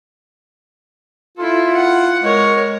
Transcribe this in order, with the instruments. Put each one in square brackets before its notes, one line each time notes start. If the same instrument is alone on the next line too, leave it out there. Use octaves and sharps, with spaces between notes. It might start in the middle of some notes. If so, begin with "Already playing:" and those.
[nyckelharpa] E4 A4 [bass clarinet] F4
[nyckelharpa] F#5
[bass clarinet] G#3 [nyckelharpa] A#4 C#5